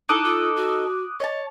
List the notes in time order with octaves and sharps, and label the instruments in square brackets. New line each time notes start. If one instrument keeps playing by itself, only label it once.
[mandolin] D#4 A4 [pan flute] E4 [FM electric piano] D6 D#6 F#6
[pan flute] F4
F#4
[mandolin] C#5 A5 [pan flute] D#5